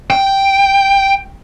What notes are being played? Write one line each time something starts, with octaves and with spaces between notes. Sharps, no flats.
G5